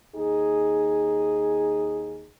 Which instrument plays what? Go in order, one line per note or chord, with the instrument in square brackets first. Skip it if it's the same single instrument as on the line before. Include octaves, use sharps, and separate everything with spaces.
[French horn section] D#2 D#4 G#4